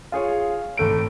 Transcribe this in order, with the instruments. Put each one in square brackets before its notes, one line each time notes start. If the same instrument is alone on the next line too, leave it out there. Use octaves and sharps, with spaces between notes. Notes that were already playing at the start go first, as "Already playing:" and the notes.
[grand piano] F4 G#4 C#5
G#1 A3 D7